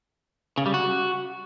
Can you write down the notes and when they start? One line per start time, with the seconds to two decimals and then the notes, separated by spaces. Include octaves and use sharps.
0.58 C#3
0.66 G3
0.74 F#4